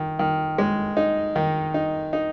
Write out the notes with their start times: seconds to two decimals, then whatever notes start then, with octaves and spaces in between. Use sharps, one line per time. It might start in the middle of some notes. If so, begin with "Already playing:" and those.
Already playing: D#3
0.19 D#3
0.58 G#3
0.97 D#4
1.36 D#3
1.74 D#4
2.13 D#4